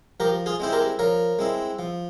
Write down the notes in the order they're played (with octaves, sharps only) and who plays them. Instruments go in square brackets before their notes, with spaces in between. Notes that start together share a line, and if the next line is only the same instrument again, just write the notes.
[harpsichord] F3 G4 A#4
F4 G#4
G#3 C4 E4 C5
G4 A#4
F3 A#4 C#5
G#3 C4 E4
F3